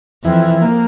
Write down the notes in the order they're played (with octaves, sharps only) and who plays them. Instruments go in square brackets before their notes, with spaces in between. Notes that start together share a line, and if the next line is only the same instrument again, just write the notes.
[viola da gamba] F2 [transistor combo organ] E3
[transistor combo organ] A#3